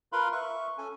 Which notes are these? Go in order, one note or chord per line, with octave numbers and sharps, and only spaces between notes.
F4 A#4 B4 F5 B5 C6
E5 C#6
C#4 A4 G#5